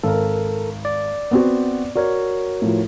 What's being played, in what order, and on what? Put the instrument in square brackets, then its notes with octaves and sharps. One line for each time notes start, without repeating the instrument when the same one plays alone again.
[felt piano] G#1 [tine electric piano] A4 A#4
[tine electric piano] D5
[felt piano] B3 C4 F#4
[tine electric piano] F#4 A#4 C#5 [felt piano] D5
[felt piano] A2 F3